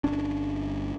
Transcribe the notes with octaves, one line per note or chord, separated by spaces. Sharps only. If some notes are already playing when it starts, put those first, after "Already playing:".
G1 C#4 D4